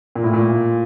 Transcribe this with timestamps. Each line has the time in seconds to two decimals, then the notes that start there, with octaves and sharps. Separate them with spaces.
0.15 A#2
0.24 A2
0.33 A#2